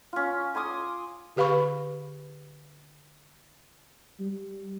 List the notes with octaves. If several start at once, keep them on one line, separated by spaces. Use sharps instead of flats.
C#4 F4
G#5 C6 D6 D#6
D3 G4 B4 F5 B5 C#6
G3